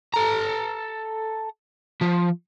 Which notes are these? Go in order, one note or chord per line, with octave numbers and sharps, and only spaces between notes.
A4 A#5
F3